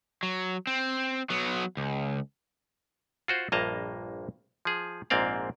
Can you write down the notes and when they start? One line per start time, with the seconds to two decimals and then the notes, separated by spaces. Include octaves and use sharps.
0.23 F#3
0.67 C4
1.30 F#3 B3
1.77 C#2
3.28 F4 F#4 C5
3.52 A#1 G2 A#3 D#5 A5 A#5
4.65 F3 G#4
5.10 A#1 G#2 A#3 C4 D5 F5